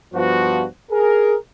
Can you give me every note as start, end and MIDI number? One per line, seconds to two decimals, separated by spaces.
0.14 0.65 43
0.14 0.65 53
0.14 0.65 59
0.14 0.65 66
0.91 1.35 68
0.91 1.35 70